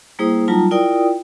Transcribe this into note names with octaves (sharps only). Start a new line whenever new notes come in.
G3 A#3 E4 G#4 C5 D#6
F#3 G3 D#4 F4 A5 A#5
E4 F4 A#4 D5 G5 D#6